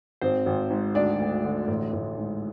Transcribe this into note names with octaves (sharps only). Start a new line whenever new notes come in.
G#1 C4 C5
G#1
G#2
D2 D4 D5
D2
D3
A1
A1
G#2